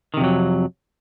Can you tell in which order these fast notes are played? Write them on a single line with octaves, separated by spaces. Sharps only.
D#3 C3 F2 F#3